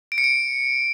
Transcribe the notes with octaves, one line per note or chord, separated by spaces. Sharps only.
D7
C#7
D7